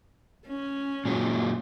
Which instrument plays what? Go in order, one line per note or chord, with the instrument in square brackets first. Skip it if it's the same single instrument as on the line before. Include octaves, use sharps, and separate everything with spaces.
[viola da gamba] C#4
[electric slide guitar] A#2 F#3 G#3